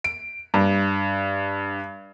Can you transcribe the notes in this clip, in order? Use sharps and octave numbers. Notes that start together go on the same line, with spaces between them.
D7
G2